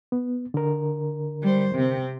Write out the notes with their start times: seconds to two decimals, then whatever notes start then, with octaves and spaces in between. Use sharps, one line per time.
0.12 B3
0.54 D3 A#4
1.42 G3 C5
1.75 C3 C4